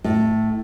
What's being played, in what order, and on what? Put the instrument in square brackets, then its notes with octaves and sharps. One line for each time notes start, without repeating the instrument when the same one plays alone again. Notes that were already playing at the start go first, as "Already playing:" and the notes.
[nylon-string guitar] A2